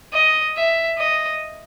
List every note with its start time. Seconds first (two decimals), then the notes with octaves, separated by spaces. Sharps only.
0.13 D#5
0.56 E5
0.98 D#5